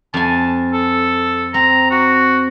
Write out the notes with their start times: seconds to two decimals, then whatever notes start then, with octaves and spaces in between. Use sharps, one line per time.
0.14 F2 G#5 A5
0.73 A4
1.54 C4 A#5
1.91 F#4